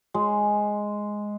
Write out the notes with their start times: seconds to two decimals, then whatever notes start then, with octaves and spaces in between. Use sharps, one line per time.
0.14 G#3